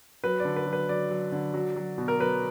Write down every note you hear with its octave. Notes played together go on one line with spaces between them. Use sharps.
F#3 B4
D5
D3
B4
F#3
B4
F#3 D5
F#3
D3
F#3
F#3
B2
A#4
F#3 B4